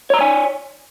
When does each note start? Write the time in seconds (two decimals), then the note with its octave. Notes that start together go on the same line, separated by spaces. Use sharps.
0.10 C#5
0.14 A#5
0.17 D5
0.21 G#5